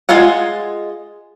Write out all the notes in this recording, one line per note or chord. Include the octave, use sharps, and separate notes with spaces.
G#3 F4 G#4 F5 F#5